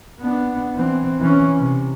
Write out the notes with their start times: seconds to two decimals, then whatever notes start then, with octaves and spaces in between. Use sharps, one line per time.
0.21 B3 D4
0.75 E3 C4
1.20 E3 C#4
1.59 C3